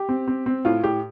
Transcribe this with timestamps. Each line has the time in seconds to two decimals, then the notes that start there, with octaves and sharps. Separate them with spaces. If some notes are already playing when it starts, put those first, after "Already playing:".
Already playing: G4
0.09 C4
0.27 C4
0.46 C4
0.65 A2 F4
0.83 A2 G4